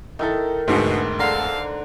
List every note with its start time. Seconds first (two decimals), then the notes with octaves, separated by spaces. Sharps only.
0.19 D#3 D#4 E4 A4
0.68 E1 D2 G#2 B2
1.19 D3 A4 F5 A#5